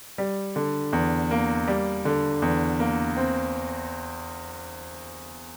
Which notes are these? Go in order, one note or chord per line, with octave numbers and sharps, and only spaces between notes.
G3
D3
E2
A#3
G3
D3
E2
A#3
C4